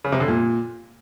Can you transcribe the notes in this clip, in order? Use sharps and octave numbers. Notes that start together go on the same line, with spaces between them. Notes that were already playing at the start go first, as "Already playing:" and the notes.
C#3
C3
D3
A#2